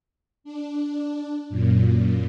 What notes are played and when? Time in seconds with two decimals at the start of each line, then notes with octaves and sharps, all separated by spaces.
0.44 D4
1.49 F#2 A#2